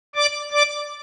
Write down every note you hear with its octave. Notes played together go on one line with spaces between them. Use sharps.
D5 D6
D5 D6